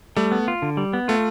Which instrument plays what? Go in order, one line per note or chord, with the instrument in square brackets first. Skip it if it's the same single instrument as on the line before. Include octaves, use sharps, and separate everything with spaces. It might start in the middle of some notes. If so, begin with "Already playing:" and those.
[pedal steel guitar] G3 [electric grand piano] A3
[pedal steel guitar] B3
F4
D3
G3
B3
[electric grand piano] A3 [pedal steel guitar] F4